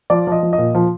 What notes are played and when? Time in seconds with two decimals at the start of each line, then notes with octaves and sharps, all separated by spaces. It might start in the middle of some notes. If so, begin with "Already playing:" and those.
0.10 F3 D5
0.27 F3 D#5
0.43 F3
0.53 D#5
0.58 A#2
0.75 F3